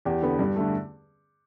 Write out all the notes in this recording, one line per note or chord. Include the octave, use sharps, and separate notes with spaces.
E2 G4
D3 B3
G2
D3 A3